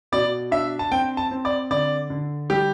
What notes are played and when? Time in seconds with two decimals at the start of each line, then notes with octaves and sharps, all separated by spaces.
0.12 B2 D5
0.51 D4 E5
0.79 A5
0.91 C4 G5
1.17 A5
1.31 C4
1.45 D5
1.70 D3 D5
2.10 D3
2.50 G3 G4